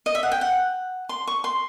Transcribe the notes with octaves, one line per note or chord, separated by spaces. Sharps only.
D#5
E5
F#5
G5
F#5
C6
C#6
C6